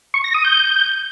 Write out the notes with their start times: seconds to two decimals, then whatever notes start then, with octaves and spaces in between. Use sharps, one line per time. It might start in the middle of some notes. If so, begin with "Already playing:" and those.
0.14 C#6
0.24 A#6
0.34 D#6
0.45 G6